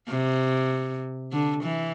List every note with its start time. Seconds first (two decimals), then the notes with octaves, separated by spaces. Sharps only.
0.09 C3
1.32 D3
1.63 E3